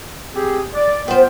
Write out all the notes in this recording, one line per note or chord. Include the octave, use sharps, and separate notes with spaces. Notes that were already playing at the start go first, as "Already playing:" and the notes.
C4 G4 G#4
D5
B3 F4 B4 C5 G5